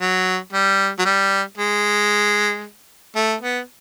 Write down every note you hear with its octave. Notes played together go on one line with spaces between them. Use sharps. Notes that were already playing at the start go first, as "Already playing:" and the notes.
F#3
G3
F#3
G3
G#3
A3
B3